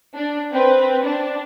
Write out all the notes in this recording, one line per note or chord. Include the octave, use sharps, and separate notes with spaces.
D4
C4 B4
D4